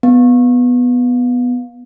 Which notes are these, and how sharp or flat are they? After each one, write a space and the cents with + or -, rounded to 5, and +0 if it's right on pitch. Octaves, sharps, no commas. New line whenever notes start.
B3 +0